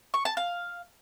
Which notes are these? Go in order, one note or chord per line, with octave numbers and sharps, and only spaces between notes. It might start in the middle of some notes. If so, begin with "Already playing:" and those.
C#6
A5
F5